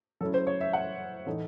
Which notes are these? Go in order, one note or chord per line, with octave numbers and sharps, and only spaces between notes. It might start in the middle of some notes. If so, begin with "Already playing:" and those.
F#3 C#4 E4 A4
C5
C#5
E5
F#5
A2 E3 A3 D#4